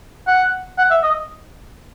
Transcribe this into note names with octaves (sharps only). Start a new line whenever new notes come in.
F#5
F#5
E5
D#5